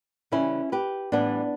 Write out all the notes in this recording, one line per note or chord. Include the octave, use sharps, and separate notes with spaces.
C#3 E3 G3 C#4 E4
G4 B4
A2 E3 G3 B3 D4